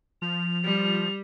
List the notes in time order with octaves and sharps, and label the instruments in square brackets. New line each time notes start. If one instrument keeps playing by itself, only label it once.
[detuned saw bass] F3 [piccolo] F7
[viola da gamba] G3